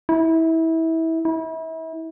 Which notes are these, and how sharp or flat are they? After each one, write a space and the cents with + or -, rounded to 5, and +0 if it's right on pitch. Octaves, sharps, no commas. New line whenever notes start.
E4 -25
E4 -35